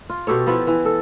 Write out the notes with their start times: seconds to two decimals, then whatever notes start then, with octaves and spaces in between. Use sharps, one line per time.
0.10 F4
0.27 B2 G4 A4 C#5
0.47 F3 B3 E4 F4
0.67 E3
0.85 A4